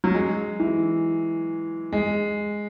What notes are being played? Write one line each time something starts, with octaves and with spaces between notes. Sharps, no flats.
F#3
G#3
E3
G#3